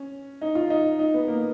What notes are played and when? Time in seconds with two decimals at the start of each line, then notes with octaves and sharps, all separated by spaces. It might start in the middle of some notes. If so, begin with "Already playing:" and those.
Already playing: C#4
0.41 D#4
0.55 F4
0.70 D#4
0.99 D#4
1.14 B3
1.28 A#3